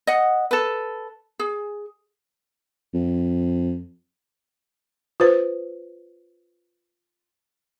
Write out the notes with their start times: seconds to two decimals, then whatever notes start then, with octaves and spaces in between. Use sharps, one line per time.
0.07 D#5 F#5
0.51 A4 B4
1.39 G#4
2.94 F2
5.20 F4 B4 C5